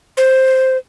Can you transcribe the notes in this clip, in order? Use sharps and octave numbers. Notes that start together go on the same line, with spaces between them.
C5